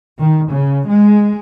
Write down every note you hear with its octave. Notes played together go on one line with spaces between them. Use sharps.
D#3
C#3
G#3